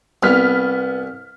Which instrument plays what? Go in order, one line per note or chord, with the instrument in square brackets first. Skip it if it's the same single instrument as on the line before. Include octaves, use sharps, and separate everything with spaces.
[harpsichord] C2 [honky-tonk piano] B3 F6 B6